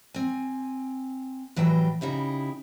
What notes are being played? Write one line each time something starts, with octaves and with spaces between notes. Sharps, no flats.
C4 G#5
A2 E3 F#3 G3 G5
C#3 D#4 E4 G4